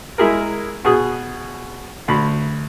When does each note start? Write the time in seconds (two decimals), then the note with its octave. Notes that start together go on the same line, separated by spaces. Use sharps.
0.18 G#3 E4 G#4 A#4
0.85 B2 G#4 D#6
2.08 D2 B5